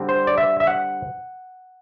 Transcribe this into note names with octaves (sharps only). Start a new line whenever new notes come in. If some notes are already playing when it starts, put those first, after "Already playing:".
Already playing: D3 G3 C4
C5
D5
E5
E5
F#5